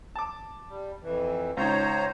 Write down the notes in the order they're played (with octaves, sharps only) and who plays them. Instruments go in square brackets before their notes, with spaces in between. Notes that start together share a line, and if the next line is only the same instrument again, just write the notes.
[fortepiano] A5 D6
[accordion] G3
F2 E3
[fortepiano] C#2 D#4 [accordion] C5 C#5 A#5